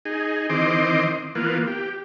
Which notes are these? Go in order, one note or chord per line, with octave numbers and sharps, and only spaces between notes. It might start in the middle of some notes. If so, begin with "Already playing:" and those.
D#4 G#4
D#3 E3 C4 D#5 C6 D6
E3 A#3 B3 F4
G4